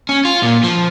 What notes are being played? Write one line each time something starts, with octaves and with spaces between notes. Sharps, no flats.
C#4
F4
A#2
F3